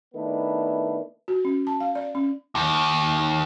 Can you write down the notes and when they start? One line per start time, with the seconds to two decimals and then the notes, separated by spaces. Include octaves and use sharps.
0.14 D#3 A3 B3 D4 E4
1.28 F#4
1.45 C#4
1.67 A5
1.80 F5
1.95 D5
2.15 C#4
2.55 D#2